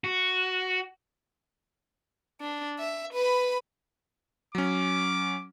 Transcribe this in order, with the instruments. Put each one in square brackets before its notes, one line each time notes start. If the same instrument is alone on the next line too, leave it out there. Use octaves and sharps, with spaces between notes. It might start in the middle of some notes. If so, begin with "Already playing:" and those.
[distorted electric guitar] F#4
[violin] D4
E5
B4 B5
[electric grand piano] F#3 C#4 [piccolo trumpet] D6